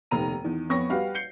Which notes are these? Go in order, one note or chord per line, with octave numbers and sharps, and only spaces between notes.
F1 D#2 B3 A#5 D#7
E2 D#3
F2 B3 C#5 C#6 A#6
G3 F#4 G4 B4 F5 F#5
G6 C7 C#7 G7